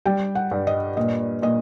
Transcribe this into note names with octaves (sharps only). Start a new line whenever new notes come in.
G3 G5
F#5
G2
D#5
A#2 D#5
A#2 D#5